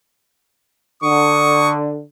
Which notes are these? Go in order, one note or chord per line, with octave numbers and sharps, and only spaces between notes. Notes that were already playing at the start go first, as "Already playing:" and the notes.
D3 C#6 D#6